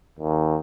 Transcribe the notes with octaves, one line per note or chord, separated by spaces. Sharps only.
D#2